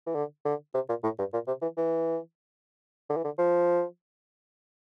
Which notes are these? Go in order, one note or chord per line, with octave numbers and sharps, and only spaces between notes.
E3
D3
D3
C3
A#2
A2
G2
A#2
C3
E3
E3
D3
E3
D3
F3